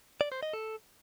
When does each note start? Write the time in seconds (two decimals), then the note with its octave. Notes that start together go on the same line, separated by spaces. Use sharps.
0.21 D5
0.32 C5
0.43 D#5
0.53 A4